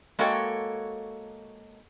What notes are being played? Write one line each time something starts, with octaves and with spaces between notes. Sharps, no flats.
G#3 A#3 F#4 A4 C#5 G5